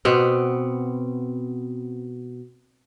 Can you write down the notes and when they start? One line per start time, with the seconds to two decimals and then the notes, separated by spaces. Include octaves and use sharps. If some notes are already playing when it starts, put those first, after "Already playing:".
0.05 B2 B3 C4